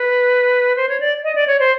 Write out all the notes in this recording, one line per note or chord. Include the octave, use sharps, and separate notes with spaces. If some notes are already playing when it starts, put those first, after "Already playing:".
Already playing: B4
C5
C#5
D5
D#5
D5
C#5
C5